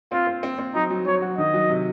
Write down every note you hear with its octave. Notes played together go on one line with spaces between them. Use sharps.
C4 F4
C4
C4
C4
F#3 D#4
F#3
F#3 C#5
F#4
D#3 D#5
F#3
C3